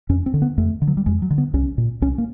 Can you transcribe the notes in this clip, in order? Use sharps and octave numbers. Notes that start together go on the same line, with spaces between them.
F2 C#4
C4
D3
B3
F2 A3
D3
F#3
G3
F2 G#3
F#3
D3
B3
C2 C#4
A#2
C2 C#4
A#3